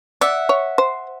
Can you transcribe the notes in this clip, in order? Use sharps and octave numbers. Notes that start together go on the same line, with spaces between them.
D5 E5 F#5
C#5
C5